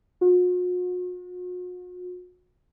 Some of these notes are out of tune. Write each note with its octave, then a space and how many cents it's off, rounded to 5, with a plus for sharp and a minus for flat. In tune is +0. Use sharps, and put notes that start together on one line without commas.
F#4 -45